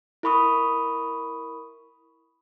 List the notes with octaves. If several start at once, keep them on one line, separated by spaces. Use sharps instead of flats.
E4 A#4 B5 C#6 D#6